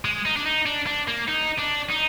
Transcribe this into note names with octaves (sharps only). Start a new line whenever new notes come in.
G#3
D#4
D4
D#4
D4
D4
A#3
D#4
D4
D#4